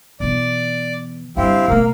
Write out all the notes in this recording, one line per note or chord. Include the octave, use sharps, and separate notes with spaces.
B2 E3 D5
G2 D3 C4 E4 G4 F5
B2 A3 A#3